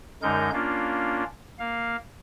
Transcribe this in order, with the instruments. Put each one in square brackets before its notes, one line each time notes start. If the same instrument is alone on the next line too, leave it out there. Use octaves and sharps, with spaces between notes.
[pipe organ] F#2 D3 G#3 D#4 A#4 G6
A#3 C#4 D4 F4
A#3 F5